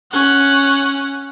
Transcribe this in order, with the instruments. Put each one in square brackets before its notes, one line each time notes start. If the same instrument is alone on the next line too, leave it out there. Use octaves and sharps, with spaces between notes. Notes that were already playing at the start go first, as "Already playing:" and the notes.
[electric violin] C#4 F#5